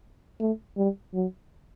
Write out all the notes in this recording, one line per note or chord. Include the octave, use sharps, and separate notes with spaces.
A3
G3
F#3